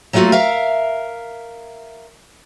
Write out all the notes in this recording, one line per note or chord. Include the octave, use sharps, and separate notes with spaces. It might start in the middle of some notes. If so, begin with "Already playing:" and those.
F#3 G3 A3 A#3 F4 F#4
A#4 E5 F5